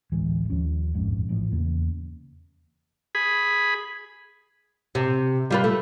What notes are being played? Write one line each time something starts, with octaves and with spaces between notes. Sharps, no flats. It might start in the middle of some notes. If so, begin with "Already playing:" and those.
D1 A1 E3 G#3
D#2 F3 C#4
A#1 F2 G#2
A1 A2 F3
E2 C#3 A#3 B3
G#4 B5
C3
G3 F4 B4
A3